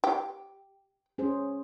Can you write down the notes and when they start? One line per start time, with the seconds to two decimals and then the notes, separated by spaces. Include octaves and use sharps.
0.04 G4
1.18 C#4 G#4 C5